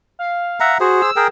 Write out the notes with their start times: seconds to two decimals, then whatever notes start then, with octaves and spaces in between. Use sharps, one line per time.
0.19 F5
0.60 E5 F#5 A#5
0.80 F#4 G#4 C5
1.02 E6
1.16 G#4 A#4 G5